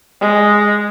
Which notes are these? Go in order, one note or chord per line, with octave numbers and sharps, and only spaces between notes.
G#3